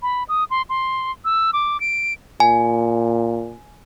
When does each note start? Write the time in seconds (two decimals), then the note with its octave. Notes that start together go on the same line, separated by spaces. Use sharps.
0.02 B5
0.28 D#6
0.50 C6
0.69 C6
1.25 E6
1.53 D6
1.80 D7
2.40 A#2 G#5